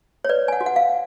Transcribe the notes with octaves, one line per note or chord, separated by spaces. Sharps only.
C#5
B4 D5
G#5
F#5
F#4
F#5
F5